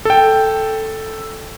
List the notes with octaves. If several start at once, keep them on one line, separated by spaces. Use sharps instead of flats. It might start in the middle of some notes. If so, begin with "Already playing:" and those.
A4 G5